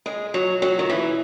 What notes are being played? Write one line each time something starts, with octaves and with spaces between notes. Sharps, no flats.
G#3
F#3
F#3
D#3
E3